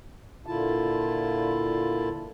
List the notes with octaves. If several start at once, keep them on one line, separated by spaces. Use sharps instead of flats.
A#2 D3 E4 F4 A5